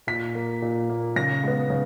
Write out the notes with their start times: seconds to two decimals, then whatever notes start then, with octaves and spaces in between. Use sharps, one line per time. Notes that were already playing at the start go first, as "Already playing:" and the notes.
0.07 A#2 B6
0.35 A#3
0.62 A#2
0.89 A#3
1.16 C#3 A#6
1.44 G#3 B3
1.70 C#3